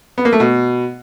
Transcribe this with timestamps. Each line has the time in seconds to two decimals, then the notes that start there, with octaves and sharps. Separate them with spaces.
0.18 B3
0.25 A#3
0.33 A3
0.40 B2